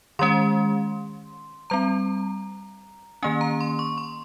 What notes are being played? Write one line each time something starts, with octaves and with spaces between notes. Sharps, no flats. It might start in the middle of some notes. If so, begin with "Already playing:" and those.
D#3 G#3 C#4 C6
G3 C4 A#5
D#3 A#3 C#4 G#5
A#5
C6
C#6
C6